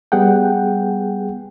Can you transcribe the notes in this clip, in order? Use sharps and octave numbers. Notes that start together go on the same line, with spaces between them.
G3 B3 G#4 F#5 G5